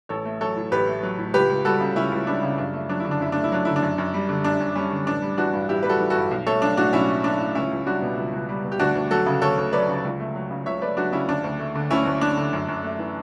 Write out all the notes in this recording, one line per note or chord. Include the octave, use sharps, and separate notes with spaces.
A1 A4 C#5
A3
F#3 A4 C#5
A2
A1 G4 B4
A3
F#3
A2
C#2 G4 B4
C#2
G3 F#4 A4
C#3
C#2 C#4 E4
C#2
G3 D4
C#3
F#2 D4
A3
F#3 D4
D3 E4
D4
F#2 E4
A3 D4
E4
F#3 D4
D3 E4
D4
F#2
F#2
G3
D3
F#2 D4
F#2
G3 C#4
D3
A1 D4
G3
E3 D4 F#4
G2
A1 E4 G4
G3 B4
F#4 A4
E3
F#4 A4
G2
B1
A3 A4 C#5
F#3 D4
A2 D4 F#4
B1 C#4 E4
A3
F#3 D4
A2
C#2 C#4 E4
C#2
G3 D4 F#4
B2
C#2
C#2
G3
B2
G4
D2 D4 F#4
D2
F#3 F#4 A4
C#3
D2 A4 C#5
D2
F#3 B4 D5
C#3
C#2
A3
F#3
C#3
C#2 C#5 E5
A3 B4 D5
F#3 D4 F#4
C#3 C#4 E4
D2 D4
D2
A3
D3
D2 C#4 E4
D2
A3 D4
D3
F#2
F#2
A3
E3